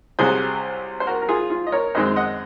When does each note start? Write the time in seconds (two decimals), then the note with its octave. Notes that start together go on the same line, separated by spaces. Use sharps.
0.19 C2 C3 F#3 G#4 C5
1.00 C5
1.07 F#4 A#4
1.22 A#4
1.29 F4 G#4
1.50 F4
1.67 D#5
1.72 A#4 C#5
1.95 F#2 D#3 G#3 C4 C5 D#5
2.16 D#5 F#5